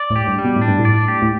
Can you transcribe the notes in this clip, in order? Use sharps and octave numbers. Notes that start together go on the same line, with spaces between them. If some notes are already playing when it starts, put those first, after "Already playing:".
Already playing: D5
A2
G4
G2
G3
B2
A2
D4
G2
A2
D5
G4
A2